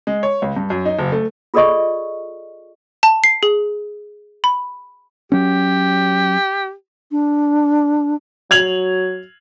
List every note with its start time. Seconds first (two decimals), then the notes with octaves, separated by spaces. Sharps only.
0.07 G#3
0.23 C#5
0.42 C#2
0.56 G2
0.70 F#2
0.86 D#4
0.99 F#1
1.12 A3
1.54 F4 G#4 A4 D5 D#5 C#6
3.03 A5
3.24 C7
3.43 G#4
4.44 B5
5.32 F#3 C#4 G4
7.11 D4
8.51 F#3 G#6 F7 F#7